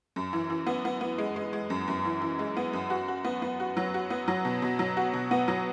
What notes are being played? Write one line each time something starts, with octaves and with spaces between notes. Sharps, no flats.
F#2
E3
E3
B3
B3
B3
G#3
G#3
G#3
F#2
F#2
E3
E3
G#3
B3
F#2
F#4
F#4
B3
B3
F#4
F#3
F#4
B3
F#3
B2
B2
F#3
F#4
B2
B3
F#3